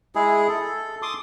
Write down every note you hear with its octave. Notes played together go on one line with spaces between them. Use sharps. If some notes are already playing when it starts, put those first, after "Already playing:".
G#3 E4 G#4
A4
C6 D6 D#6